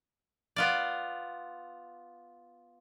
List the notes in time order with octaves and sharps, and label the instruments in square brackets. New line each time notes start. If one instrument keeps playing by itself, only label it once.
[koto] B3 F4 D5